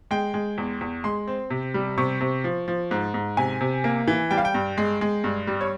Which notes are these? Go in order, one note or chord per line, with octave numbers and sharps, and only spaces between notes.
G#3 G5
G#3
E2
E2
G#3 C6
C4
C3
G3
C3 C#6
C3
F3
F3
G#2
G#2
C3 G#5
C3
A#3
E3
G3 G5
F5
G5
G2
G#3
G#3
G2
G3
C#5